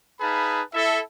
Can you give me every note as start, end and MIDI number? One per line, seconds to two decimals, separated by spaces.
0.21 0.61 63
0.21 0.61 68
0.21 0.61 71
0.21 0.61 77
0.21 0.61 81
0.21 0.61 83
0.74 1.00 64
0.74 1.00 69
0.74 1.00 76